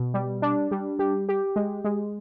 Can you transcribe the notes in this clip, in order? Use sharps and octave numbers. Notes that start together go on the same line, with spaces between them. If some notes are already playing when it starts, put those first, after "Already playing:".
Already playing: B2
G3
D4
G3
G4
G4
G#3
G#3